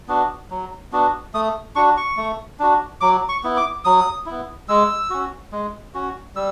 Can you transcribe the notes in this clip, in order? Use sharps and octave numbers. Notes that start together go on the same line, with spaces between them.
B3 D4 F#4
F#3
B3 D4 F#4
A3 D#6
D4 F#4 C#6
C#6
A3
D4 F#4
F#3 D6
C#6
B3 E4
D6
F#3 D#6
B3 E4
G#3 E6
C#4 F#4
G#3
C#4 F#4
G3 E6